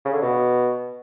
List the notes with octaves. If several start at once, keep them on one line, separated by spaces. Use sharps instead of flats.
C#3
D3
B2